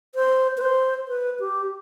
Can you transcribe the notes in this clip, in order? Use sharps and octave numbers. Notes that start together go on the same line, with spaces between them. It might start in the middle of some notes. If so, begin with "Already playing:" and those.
C5
B4
C5
B4
G4